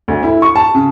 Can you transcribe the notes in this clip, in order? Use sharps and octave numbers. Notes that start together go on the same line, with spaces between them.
D2
E4
C#6
A5
C#3